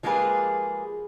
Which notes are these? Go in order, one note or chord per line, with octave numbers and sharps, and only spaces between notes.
F3 G#3 A#3 G4 G#4 B4